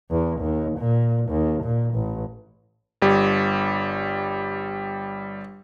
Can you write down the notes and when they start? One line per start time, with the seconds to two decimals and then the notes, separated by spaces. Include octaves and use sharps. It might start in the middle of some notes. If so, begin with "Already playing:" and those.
0.11 E2
0.40 D#2
0.78 A#2
1.29 D#2
1.63 A#2
1.95 A1
3.02 G1 G3